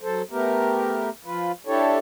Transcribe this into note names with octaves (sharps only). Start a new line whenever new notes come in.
F#3 A4 C5
A3 B3 G4 A#4
F3 F4 B4
D4 E4 G4 A4 C#5